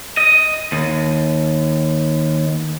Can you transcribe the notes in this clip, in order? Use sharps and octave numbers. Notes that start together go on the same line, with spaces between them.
D#5
D#2